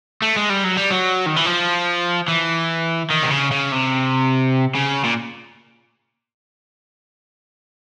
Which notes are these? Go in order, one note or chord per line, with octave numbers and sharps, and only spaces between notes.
A3
G#3
G3
F#3
G3
F#3
D#3
E3
F3
E3
D#3
C3
C#3
C#3
C3
C#3
A#2